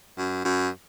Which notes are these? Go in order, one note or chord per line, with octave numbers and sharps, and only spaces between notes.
F#2
F#2